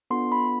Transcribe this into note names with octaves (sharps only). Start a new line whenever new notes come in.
B3 D4 F4 A4 C6
B5